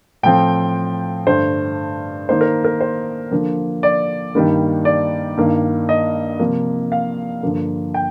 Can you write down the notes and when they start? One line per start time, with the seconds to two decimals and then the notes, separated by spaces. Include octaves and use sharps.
0.23 A2 F3 C4 G5
1.27 G2 D3 A3 C5
2.29 D#3 A#3 D#4 C5
2.41 A#4
2.64 A#4
2.81 C5
3.31 D3 F3 A#3 D4
3.83 D5
4.35 G2 D#3 G3 A#3 D4
4.85 D5
5.37 G2 D#3 A#3
5.89 D#5
6.39 C3 F3 A#3
6.92 F5
7.43 G2 D3 F3 A#3
7.94 G5